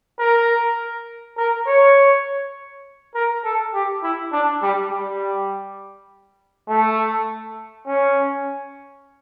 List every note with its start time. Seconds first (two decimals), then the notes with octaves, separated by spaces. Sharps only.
0.19 A#4
1.37 A#4
1.67 C#5
3.15 A#4
3.44 A4
3.74 G4
4.03 E4
4.32 D4
4.62 G3
4.92 G3
6.69 A3
7.87 C#4